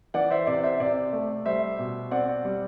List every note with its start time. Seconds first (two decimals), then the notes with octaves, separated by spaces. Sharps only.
0.14 E3 D5 F#5
0.30 C5 E5
0.47 C3 D5
0.63 C5 E5
0.80 C3 D5
1.13 A3
1.46 G3 C5 E5
1.79 B2
2.11 C4 D5 F#5
2.45 G3